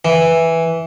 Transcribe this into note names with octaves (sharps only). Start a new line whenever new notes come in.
E3